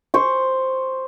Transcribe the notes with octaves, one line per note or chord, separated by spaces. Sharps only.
C5 C#6